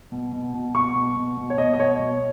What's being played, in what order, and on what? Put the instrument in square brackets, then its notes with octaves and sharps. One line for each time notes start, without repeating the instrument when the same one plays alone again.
[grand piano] B2
B2
B2
B2 C#6
B2
B2
B2
C#5
B2 D#5
D#5
B2 C#5
B2